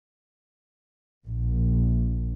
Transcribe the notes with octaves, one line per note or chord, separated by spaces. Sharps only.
A#1